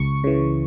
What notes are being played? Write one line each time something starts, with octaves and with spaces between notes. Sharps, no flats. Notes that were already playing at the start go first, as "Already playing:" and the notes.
Already playing: C#2 C#6
C#3 E3